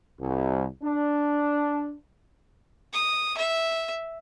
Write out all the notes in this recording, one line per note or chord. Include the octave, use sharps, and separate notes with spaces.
C2
D4
D#6
E5